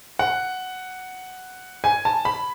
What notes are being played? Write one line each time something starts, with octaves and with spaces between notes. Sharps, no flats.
F#5
G#5
A5
B5